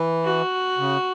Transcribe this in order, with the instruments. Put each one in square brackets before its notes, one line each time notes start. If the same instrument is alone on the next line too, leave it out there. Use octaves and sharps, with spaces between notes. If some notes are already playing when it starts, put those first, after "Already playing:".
Already playing: [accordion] E3
[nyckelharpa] F#4
[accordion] C#3